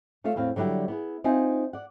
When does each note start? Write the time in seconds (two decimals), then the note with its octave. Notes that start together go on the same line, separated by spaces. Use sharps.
0.24 A3 F4 A4 C#5 E5 F5
0.36 E2 A2 C4 F5
0.56 D3 F#3 G3 E4 G5
0.88 B3 E4 G#4
1.24 C4 D#4 F4 E5 G#5
1.73 D5 F#5